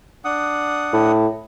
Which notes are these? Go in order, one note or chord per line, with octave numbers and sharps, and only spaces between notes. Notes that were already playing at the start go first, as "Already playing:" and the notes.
D4 F#5 D#6
A2